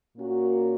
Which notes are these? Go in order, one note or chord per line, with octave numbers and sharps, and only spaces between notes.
A#2 A#3 C#4 F#4 A#4